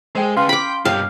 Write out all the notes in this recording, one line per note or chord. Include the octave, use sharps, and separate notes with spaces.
G#3 G#4 A#4 C5 G5
C#3 C#4 B4 F5 C6
G5 B5 D6
G2 B2 G4 A#4 C#5 F5 G5